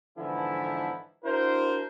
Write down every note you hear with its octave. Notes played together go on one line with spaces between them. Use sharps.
G#2 D3 E3 F3 B3 E4
D4 E4 F#4 A#4 C5